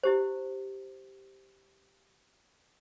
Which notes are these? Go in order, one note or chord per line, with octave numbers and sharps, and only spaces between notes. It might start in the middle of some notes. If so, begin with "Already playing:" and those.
E4 G4 C5